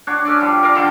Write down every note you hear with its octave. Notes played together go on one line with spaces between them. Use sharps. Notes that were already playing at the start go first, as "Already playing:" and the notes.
D4 F#4 C#5
C#4 A4 D5
F3 G3
A#4 D5 F5
D3 D#3 A4